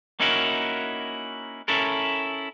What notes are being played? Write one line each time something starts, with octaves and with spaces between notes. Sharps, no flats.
A#3 C#4 D#4 E4 F#4 A#4
C#4 E4 A4 A#4